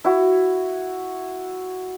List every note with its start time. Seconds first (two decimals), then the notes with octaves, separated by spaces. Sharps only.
0.04 E4 F#4